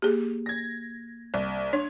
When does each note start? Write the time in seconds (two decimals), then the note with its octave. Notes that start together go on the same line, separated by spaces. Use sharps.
0.02 A#3 G4 G#4
0.46 G#6 A#6
1.34 C2
1.73 D4 C#5